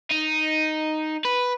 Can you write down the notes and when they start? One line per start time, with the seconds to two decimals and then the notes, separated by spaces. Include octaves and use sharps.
0.11 D#4
1.25 B4